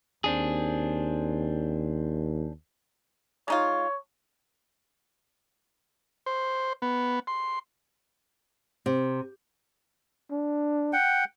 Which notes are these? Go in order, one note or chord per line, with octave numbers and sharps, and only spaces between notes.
D#2 C4 D4 G#4
G#3 D#4 F4 C#5
C5
B3
C6
C3
D4
F#5 G5